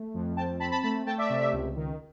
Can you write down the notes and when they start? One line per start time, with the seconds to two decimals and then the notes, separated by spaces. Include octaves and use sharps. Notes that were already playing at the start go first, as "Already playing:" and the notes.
Already playing: A3
0.14 F2
0.37 C4 G5 A5
0.60 C4 A5 B5
0.72 A5 B5
0.83 A3 A5 B5
1.06 A3 G5 A5
1.18 D5 E5
1.30 C3
1.53 C#2
1.76 D#3